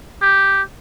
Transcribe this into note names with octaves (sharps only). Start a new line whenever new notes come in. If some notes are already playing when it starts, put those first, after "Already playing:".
G4